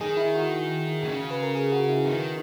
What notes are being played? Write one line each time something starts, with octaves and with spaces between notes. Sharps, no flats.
D#3 G#4
E4
F#4
C#3
B4
A#4
G#4
F#4
E4
D#3